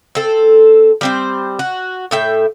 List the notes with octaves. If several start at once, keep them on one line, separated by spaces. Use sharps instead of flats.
C4 A4
G3 C4 C5
F#4
A2 E5 G5